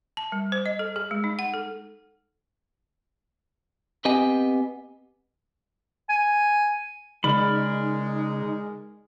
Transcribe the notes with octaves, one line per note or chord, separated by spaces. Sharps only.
A5
G3
C5
D#5
A4
G#4
G#3
D#4
F#5
A4
B3 C4 G4 D#5 G#5
G#5
C#3 G#3 D#4 A#4 D5 B5